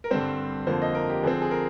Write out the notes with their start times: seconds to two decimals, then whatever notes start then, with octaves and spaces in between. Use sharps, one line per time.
0.04 A#4
0.11 G2 D3 G3 C4 C5
0.67 F2 D3 F3 A#3 C5
0.82 D#5
0.95 A#4
1.10 G4
1.23 D3 F3 C4 G#4
1.42 G#4
1.51 A#4